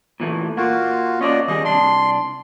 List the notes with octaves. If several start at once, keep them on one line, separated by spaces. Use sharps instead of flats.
A#2 E3 A3
A#2 A#3 F4 F#4
C#4 F4 D5 D#5
D#2 G3 G#4 D#5
C2 D4 C6